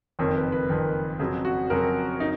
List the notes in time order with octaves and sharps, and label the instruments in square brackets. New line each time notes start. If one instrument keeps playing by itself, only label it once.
[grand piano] F#1 F2 D#3 [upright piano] C#5
[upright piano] B4
B4
[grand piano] F#1 F2 D#3
[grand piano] F2 C#3 F#3 [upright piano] G#4
[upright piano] F#4
[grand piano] F2 C#3 F#3 [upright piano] A#4
[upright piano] D#4